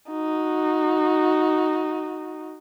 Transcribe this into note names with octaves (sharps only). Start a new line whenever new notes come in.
D#4 F#4